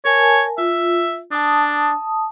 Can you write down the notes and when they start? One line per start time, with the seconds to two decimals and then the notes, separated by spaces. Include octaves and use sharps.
0.05 A#4 C#5 G#5 A5
0.58 F4 E5
1.31 D4 A5 D#6